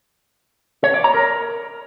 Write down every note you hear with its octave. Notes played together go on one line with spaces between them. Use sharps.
C#5
D5
A#5
A#4